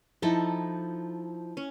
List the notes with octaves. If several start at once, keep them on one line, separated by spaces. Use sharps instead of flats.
F3 D#4 E4 A4
C#4